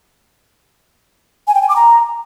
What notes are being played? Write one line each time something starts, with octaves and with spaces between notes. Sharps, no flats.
G#5
G5
G#5
D6
A#5